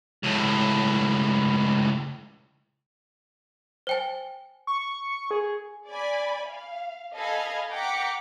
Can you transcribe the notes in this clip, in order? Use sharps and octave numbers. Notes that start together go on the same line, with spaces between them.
C#2 A2
C5 G5 G#5
C#6
G#4
D5 G#5 B5
F5
A4 D#5 F5 G#5 B5 G#6
F#5 G5 A#5 D6 B6 C#7